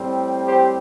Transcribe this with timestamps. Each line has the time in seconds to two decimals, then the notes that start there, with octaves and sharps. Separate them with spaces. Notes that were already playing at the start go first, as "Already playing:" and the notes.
Already playing: A2 G3 C4
0.45 G4 C5